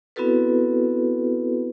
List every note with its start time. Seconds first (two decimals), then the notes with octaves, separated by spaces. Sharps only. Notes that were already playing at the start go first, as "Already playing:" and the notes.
0.16 B3 C4 E4 F#4 A4 B4